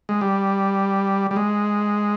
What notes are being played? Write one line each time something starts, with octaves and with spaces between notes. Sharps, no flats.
G#3
G3
G3
G#3